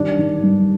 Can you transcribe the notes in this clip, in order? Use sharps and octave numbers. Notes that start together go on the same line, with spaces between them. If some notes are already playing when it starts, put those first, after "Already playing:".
Already playing: D#3 G3 D4
D#3
G2